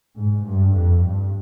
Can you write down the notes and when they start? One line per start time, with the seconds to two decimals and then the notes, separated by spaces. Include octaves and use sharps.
0.16 G#2
0.45 G2
0.74 F2
1.04 G2